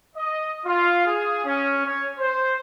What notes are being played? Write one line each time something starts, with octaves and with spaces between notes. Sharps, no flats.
D#5
F4
G#4
C#4
C#5
C5